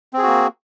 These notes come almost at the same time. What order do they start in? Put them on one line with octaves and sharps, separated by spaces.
C4 G#4 F#4 A#3